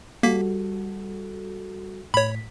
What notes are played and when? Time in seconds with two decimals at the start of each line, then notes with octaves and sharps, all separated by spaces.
0.23 G3 A#3 F#4 A4 B6
2.14 A2 C#5 B5 B6